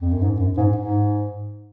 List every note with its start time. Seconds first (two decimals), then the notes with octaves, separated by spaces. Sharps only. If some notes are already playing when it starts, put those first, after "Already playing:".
0.01 F2
0.11 F#2
0.21 G#2
0.39 F#2
0.57 G#2
0.76 G#2